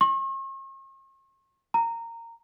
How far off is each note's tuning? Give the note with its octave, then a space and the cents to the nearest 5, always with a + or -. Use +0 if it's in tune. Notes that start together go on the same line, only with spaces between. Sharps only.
C#6 -45
A#5 -15